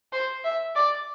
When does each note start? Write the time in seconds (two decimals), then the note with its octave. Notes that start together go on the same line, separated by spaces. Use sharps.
0.13 C5
0.44 E5
0.76 D5